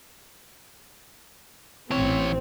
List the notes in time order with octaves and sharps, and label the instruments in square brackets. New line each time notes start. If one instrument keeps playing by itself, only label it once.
[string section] A1 C4 [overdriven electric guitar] E3 C#5